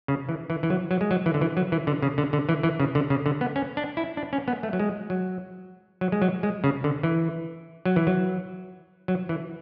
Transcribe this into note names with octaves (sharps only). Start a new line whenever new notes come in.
C#3
E3
E3
E3
F#3
F#3
G#3
F#3
E3
D3
E3
F#3
E3
D3
C#3
D3
D3
E3
E3
C#3
D3
C#3
D3
B3
C#4
D4
E4
D4
C#4
B3
A3
F#3
G#3
F#3
F#3
G#3
F#3
G#3
C#3
D3
E3
F#3
E3
F#3
F#3
E3